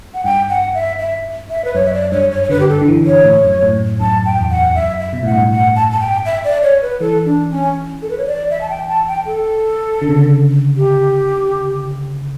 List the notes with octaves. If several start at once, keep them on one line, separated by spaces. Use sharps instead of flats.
F#5
G2 G5
F#5
E5
E5
E5
B4
F#2 C#5
E5
D5
G2 C#5
C#5
C#5
D3 B4
G4
A4
D3
E3
C#5
A2
F#2
A2
F#2 A5
G5
E2
F#5
F#2 E5
E5
B2
A2 F#5
G2
A2
F#5
A5
A5
G5
E5
D5
C#5
B4
E3 A4
D4
C#4
A4
B4
C#5
D5
E5
A5
G5
A5
G5
A4
D3
C#3
D3
G4